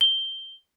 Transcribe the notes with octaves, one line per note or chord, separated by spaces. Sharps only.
G7